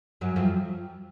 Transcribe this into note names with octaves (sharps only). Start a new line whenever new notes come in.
F#2 F#3
F2 F3